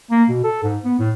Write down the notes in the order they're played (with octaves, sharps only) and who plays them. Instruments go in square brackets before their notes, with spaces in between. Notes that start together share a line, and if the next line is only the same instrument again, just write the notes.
[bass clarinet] A#3
B2
A4
G#2
B3
A2